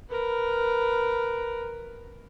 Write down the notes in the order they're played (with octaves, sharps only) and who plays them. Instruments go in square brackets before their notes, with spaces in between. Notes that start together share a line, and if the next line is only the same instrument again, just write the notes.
[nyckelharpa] A#4 B4